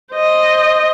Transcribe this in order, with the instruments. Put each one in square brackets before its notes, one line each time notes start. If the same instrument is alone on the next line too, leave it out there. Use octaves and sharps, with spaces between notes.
[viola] C5 D#5